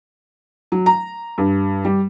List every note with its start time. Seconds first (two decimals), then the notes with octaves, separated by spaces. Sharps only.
0.72 F#3
0.86 A#5
1.38 G2
1.85 G3